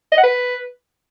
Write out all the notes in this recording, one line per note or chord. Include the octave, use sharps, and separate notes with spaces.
D#5
F#5
B4